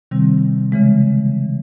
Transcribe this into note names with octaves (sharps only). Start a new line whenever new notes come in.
C3 D#3 G3 C4
C#3 E3 G#3